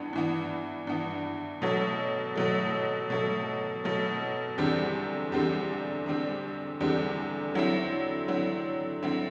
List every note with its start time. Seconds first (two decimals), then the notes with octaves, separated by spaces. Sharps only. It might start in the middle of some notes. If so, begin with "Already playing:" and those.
Already playing: G2 E3 B3
0.13 G2 E3 B3
0.87 G2 E3 B3
1.62 B2 F#3 A3
2.36 B2 F#3 A3
3.10 B2 F#3 A3
3.84 B2 F#3 A3
4.58 E2 D3 G3 C4 G4
5.32 E2 D3 G3 C4 G4
6.06 E2 D3 G3 C4 G4
6.80 E2 D3 G3 C4 G4
7.54 D3 F#3 C4 E4
8.28 D3 F#3 C4 E4
9.03 D3 F#3 C4 E4